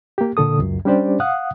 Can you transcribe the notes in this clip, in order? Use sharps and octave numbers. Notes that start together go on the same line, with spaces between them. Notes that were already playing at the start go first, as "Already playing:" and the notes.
A#3 G4
A#2 D3 A4 D#6
C#2 F#2
G3 C#4 D4 G4 C5 D5
F5 F#5 D#6 F#6